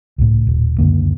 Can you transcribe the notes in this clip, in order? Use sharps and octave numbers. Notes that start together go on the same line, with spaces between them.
C#2 A2
D#1
C#2 F#2 D3 A#3